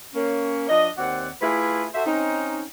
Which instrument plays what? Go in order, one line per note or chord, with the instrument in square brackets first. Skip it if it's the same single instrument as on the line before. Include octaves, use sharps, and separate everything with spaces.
[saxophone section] A#3 C#4
F3 D4 D#5
D#2 C4 D5 F#5
A3 E4 F4 G#4 B4
F#4 A4 C5 E5
C4 C#4 D#4